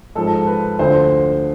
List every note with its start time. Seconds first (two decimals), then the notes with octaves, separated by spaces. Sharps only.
0.15 G#2 F3 A4
0.47 B4
0.79 D2 D3 F3 C5